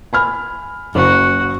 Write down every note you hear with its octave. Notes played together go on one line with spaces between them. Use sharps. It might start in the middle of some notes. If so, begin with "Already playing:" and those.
G#5 B5 F6
F#1 F#4